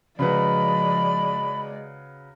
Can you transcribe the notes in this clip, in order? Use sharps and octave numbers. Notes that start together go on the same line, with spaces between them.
C#3 F3 F#3 G#3 B4 D5 B5